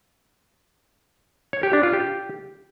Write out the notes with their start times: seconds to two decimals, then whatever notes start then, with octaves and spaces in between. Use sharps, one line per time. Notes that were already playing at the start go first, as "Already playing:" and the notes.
1.53 C#5
1.63 G4
1.73 D4
1.83 F4
1.93 G4